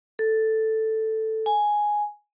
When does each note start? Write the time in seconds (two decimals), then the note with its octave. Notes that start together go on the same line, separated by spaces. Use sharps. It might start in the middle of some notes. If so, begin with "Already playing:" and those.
0.19 A4
1.46 G#5